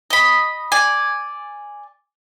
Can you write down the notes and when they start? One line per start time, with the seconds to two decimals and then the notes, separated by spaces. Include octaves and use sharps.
0.10 D#5 B5
0.72 D5 G#5